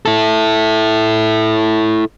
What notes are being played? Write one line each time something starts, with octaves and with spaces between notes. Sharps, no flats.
E4 A4